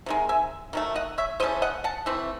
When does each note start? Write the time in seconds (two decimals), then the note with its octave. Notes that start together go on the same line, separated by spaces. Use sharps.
0.06 C3 D#3 G#3
0.29 E5 G#5
0.73 D#3 F#3 A3
0.96 D#5 F#5
1.18 C#5 E5
1.40 C#3 E3 A3 C#4 C5 D#5
1.62 D#5 F#5
1.84 F#5 A5
2.06 E3 A3 C4